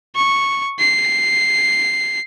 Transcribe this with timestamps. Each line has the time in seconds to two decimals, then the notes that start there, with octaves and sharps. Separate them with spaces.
0.15 C#6
0.79 C7